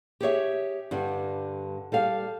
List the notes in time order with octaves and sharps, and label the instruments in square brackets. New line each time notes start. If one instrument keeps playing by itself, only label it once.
[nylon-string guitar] G4 G#4 C#5 E5
G2 D3 G3
G3 A4 F5